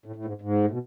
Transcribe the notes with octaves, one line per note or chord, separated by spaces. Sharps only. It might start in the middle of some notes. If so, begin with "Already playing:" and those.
A2
A2
G#2
G#2
A2
B2